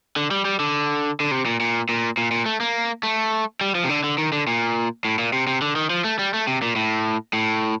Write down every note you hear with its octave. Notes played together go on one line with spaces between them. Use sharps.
D3
G3
G3
D3
D3
C3
A#2
A#2
A#2
A#2
A#2
A3
A#3
A3
G3
F3
C3
D3
D3
D#3
D3
A#2
A2
A#2
C3
C3
D3
D#3
F3
A3
G3
A3
C3
A#2
A2
A2